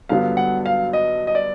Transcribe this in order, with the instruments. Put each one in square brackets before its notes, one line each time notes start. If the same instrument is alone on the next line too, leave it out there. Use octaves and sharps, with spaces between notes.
[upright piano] G2 D3 F#3 B3 [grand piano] F5
[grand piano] F#5
F5
D#5
D#5
D5